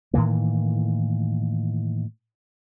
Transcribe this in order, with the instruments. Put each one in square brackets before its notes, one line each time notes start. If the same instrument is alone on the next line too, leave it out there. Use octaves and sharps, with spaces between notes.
[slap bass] A2 D#3 E3 A#3